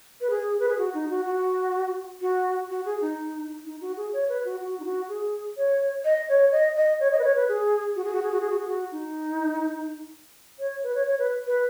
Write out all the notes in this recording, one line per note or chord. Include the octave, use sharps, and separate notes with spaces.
B4
G#4
B4
G#4
F#4
D#4
F#4
F#4
F#4
F#4
G#4
D#4
D#4
F#4
G#4
C#5
B4
F#4
F#4
D#4
F#4
G#4
C#5
D#5
C#5
D#5
D#5
C#5
D#5
B4
C#5
B4
G#4
F#4
G#4
F#4
G#4
F#4
G#4
F#4
G#4
F#4
D#4
C#5
B4
C#5
C#5
B4
B4